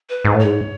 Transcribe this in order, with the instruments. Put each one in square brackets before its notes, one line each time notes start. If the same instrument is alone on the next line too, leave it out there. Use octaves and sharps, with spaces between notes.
[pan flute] B4
[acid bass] G#2
A2
[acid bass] G#2 [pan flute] C#5